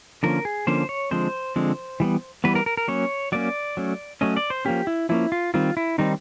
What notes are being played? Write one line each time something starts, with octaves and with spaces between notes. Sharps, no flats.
D3 F3 A#3 C#4 A#4
G#4
D3 F3 A#3 C#4 C5
C#5
D3 F3 G#3 C4 C5
D3 F3 G#3 C4
E3 G3 B3
E3 G3 B3 B4
A#4
A#4
A#4
F#3 A#3 C#4 C#5
F#3 A#3 C#4 D5
F#3 A3 C#4
F#3 A3 C#4 D#5
D5
C5
F3 A#3 C#4 G4
E4
F3 A#3 C#4 E4
F4
D#3 G3 C4 F4
E4
D#3 G3 C4 D#4